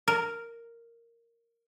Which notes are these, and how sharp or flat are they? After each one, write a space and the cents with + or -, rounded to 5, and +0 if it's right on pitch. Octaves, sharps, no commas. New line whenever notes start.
A#4 -5